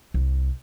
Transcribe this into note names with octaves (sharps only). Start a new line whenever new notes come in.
C2